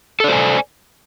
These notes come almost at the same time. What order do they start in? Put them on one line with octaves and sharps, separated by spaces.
A4 D5 C5 G#5